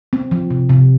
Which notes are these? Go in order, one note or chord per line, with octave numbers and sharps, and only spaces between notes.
C4
F3
C3
C3